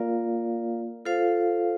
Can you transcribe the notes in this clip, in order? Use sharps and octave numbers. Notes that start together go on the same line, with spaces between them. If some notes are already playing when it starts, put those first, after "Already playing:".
Already playing: A#3 F4 A#4 D5 F5
F4 A4 C5 F5